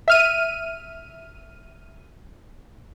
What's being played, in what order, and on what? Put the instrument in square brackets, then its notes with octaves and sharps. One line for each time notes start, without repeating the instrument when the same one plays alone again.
[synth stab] E5 F6 D#7